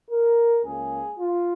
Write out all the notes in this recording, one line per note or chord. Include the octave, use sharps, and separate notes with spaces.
A#4
C#2 C#3 A#3 G#4
F4